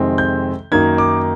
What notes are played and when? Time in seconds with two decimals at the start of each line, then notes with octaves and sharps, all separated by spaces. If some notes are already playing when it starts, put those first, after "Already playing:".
Already playing: F2 C3 D#3 G#3 C4
0.18 G6
0.72 F#2 D#3 F#3 A#3 D#4 G#6
0.98 D6